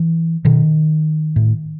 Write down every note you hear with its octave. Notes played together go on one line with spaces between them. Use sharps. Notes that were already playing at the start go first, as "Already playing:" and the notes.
Already playing: E3
B2 D#3
A2